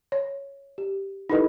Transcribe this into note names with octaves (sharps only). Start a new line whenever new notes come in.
C#5
G4
D#4 E4 G4 A4 B4 D#5